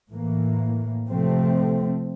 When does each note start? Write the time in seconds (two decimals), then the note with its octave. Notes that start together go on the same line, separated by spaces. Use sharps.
0.11 A2 E3 A#3
1.08 C3 F3 A3 C4